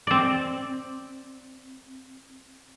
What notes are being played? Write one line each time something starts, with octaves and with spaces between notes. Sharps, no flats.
C4 D5